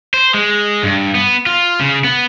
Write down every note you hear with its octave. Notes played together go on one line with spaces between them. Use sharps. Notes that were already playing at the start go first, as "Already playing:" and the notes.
C5
G#3
G2
B3
F4
C#3
B3